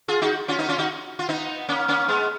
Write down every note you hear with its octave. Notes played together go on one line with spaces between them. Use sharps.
F4 G#4
D#4 F#4
C#4 F4
B3 D#4
C#4 F4
D#4 F#4
F4
B3 D#4
A#3 C#4
A#3 C#4
G#3 B3